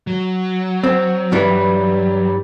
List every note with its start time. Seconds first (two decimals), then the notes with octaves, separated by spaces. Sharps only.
0.07 F#3
0.84 C4
1.32 G2 E3 G3